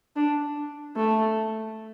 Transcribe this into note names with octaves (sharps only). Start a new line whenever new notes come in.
D4
A3